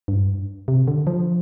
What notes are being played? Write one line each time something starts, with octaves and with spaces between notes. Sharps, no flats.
G2
C3
D3
F3